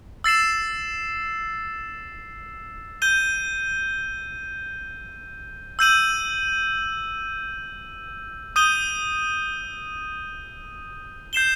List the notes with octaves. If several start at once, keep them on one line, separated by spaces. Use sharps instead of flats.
E6 A6 C7 E7
G6 D#7 G7
E6 G6 D#7 F#7
D#6 G6 D#7 G7
G6 C7 E7 G7